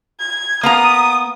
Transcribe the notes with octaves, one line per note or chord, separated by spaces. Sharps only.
G#6
A#3 B3 A#5 D#6